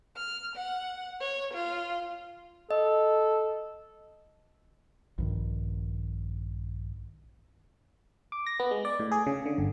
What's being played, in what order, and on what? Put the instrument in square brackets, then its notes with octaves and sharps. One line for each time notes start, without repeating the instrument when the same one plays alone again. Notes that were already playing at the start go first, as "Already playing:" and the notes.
[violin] F6
F#5
C#5
F4
[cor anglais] A4 [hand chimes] D#5
[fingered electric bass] A#1 G2 D#3
[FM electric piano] D6
A#6
B3
G#3
D5
A2
G#4
C#3
D3
G1